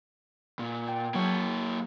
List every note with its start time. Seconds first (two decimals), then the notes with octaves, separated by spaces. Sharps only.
0.59 A#2
0.88 G5
1.14 F#3 A#3 G#4 C#5